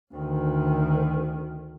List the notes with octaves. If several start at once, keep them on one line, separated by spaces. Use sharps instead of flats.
D2 D#3